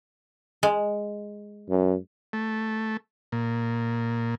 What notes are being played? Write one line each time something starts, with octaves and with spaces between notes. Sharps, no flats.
G#3
F#2
A3
A#2